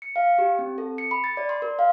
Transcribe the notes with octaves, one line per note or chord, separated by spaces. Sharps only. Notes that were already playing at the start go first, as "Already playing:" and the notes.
C#7
F5
G4
C4
A4
C#7
B5
A6
D5
C6
A#4
F5